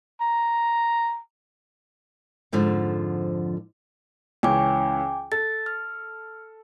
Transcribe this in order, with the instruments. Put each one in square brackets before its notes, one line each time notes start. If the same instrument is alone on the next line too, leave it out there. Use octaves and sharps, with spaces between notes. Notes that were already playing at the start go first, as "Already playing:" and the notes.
[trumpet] A#5
[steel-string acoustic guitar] F2 G#2 D3 F3
[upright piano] C#2 E3 C#4 [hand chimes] G5 G#5 D6
[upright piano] A4 [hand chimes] A6
[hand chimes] F6